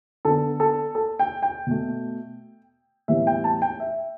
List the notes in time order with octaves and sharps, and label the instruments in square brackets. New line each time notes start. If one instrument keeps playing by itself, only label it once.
[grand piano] D3 B3 A4
A4
A4
G5
G5
B2 A3
A2 E3 G3 B3 E5
G5
A5
G5
E5